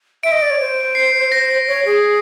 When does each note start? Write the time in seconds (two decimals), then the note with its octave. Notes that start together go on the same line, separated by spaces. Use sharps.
0.23 E5 D7
0.32 D#5
0.42 D5
0.50 C#5
0.60 C5
0.95 C7
1.32 A#6
1.68 C#5
1.85 G#4